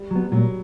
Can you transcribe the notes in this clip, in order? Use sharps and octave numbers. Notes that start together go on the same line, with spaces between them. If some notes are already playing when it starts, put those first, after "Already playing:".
Already playing: G3
F#3 B3
A#2 F#3